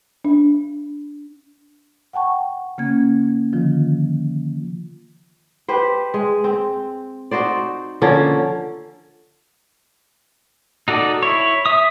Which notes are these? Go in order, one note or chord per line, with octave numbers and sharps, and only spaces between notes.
D4
F#5 G5 A5 C#6
C#3 A#3 C#4 G#6
D3 D#3 F3 F4
G4 B4 C5
G#3
C4
D#4 F#4 C5 D5
D3 F3 A#3 C#4
D#4 F#4 A4 D5
E4 C#5
E5 D#6